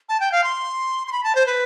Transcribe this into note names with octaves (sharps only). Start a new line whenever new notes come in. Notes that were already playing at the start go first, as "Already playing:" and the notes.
A5
G5
F5
C6
C6
B5
A5
C5
B4